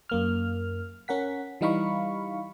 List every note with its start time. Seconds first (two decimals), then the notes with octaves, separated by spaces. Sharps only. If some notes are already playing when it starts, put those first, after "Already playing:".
0.09 F#2 A#3 F6
1.08 C#4 A#4 F#5 B6
1.61 E3 G3 D#4 F5 B5 C#6